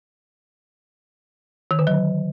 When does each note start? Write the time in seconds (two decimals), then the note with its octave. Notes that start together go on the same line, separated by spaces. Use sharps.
1.71 D#3
1.79 D3
1.87 F#3